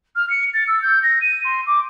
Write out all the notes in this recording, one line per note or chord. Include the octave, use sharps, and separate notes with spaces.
F6
C#7
A6
E6
G6
A#6
D#7
C6
D6